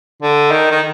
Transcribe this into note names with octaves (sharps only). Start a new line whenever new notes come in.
D3
D#3
D#3